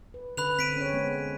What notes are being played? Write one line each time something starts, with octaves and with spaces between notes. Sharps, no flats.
B4
D3 C#4 B4 B5 F#6 F7
C4 B6 D7 D#7
C#4 G#4 C#5
G#3 B3 C5